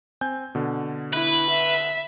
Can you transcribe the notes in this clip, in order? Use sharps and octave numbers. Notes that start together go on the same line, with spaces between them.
C4 G#5 G6
B2 D3
E4 B4
E5